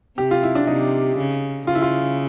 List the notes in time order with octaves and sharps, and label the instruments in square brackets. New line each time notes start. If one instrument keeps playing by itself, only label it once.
[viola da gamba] C3 [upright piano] G4
[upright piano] F4
E4
D4
[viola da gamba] C3 [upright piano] D#4
[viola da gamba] C#3
[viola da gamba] C#3 [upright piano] F4
[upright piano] E4
F4